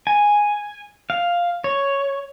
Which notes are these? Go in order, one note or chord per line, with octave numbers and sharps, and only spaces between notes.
G#5
F5
C#5